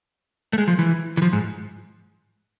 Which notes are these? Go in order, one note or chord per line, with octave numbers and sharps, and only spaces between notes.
A3
G#3
F3
E3
E3
F3
G#2